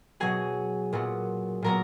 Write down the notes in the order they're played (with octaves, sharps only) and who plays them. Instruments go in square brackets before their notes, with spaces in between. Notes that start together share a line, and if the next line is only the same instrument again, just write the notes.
[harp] B2 F#3 B3 G#4 G#5
A#2 F#3 B3
A#2 F#3 B3 A#4 A#5